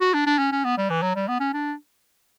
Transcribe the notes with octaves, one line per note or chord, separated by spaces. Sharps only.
F#4
D4
D4
C#4
C#4
B3
G3
E3
F#3
G3
B3
C#4
D4